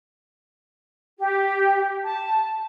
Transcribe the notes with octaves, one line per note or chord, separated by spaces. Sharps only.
G4
A5